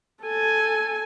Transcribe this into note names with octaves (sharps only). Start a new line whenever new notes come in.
A4 G#5